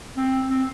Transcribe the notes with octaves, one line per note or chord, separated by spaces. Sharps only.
C4
C4